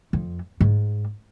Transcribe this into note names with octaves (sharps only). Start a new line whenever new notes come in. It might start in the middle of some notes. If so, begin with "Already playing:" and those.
F2
G#2